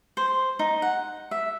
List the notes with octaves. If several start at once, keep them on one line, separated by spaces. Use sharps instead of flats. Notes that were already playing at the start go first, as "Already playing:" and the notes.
C5
D#4
F#5
E5